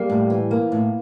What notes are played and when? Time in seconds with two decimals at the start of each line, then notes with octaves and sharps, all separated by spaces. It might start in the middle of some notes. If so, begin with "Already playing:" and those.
Already playing: G3 A#3
0.10 A2
0.30 E3
0.51 A#3
0.72 A2